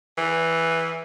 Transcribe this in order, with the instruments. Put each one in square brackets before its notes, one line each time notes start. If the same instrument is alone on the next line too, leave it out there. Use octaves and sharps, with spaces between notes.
[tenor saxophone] E3